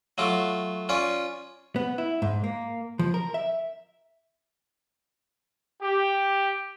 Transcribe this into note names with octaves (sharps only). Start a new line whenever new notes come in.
F#3 A3 F4 D6
C#4 F4 D5
B3
E4
G#2
A#3
F3
A#4
E5
G4